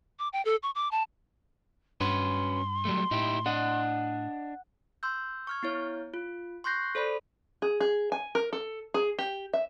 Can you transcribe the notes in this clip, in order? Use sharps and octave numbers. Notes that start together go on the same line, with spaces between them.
D6
G5
A4
C#6
D6
A5
G2 C#4 F#4 B4 C6
F#3 G3 A3
A2 D#4 E4 G4
D4 D#5 F#5
C6 E6 G6
C#6 F6 G#6
B3 E4 C#5
F4
C6 C#6 F#6 G6 A#6 C7
A4 C5 D5 B5
G#4
G#4
G#5
A#4
A4
G#4
G4
E5